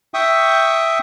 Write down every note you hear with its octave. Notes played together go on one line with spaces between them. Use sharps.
E5 G5 C#6 D#6